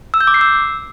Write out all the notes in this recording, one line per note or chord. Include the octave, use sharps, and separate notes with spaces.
E6
G6
D6
C7
E6